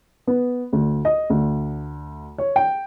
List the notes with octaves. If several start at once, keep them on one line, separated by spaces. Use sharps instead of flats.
B3
D2
D#5
D2
C#5
G5